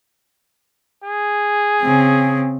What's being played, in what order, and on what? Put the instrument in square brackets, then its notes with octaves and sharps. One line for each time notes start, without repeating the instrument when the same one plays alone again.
[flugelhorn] G#4
[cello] C#3 C4